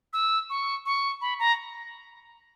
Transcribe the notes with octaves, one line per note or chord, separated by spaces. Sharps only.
E6
C#6
C#6
B5
A#5